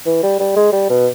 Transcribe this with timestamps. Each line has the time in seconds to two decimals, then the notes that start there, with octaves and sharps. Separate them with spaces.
0.06 E3
0.23 G3
0.39 G3
0.56 G#3
0.72 G3
0.90 B2